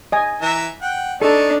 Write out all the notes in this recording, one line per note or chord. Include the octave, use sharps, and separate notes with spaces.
D#5 G#5
E3 E5 A#5
F#5 G5
D4 D#4 A4 A5 C#6